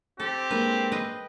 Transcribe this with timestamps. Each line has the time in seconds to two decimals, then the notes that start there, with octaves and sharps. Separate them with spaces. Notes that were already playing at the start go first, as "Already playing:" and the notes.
0.20 C4 G4 A4
0.51 G#3 A#3 D4 B4
0.92 B4 D#5 G5